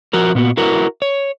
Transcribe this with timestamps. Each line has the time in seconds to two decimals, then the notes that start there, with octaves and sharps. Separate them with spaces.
0.13 F3 F#4 A#4
0.35 A#2 B3 F4 F#4
0.57 E4 F#4 A#4 B4
1.02 C#5